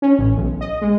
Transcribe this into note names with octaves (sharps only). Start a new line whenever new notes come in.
C#4
A1
B1
D#5
G#3